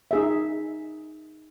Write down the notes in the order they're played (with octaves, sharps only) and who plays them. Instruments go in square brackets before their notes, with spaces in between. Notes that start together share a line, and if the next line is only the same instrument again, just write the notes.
[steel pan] D#4 G#4 E5